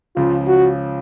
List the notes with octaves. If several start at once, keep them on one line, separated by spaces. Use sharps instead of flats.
C#2 C#3 F3 F4
F#4